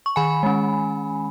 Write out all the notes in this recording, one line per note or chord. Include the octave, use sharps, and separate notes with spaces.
C#6
D#3 G#5 B5
G#3 C#4